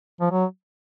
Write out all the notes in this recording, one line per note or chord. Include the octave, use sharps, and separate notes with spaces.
F3
F#3